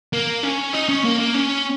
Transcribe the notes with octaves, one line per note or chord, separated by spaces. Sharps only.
A#3
C#4
D#4
C#4
A#3
A#3
C#4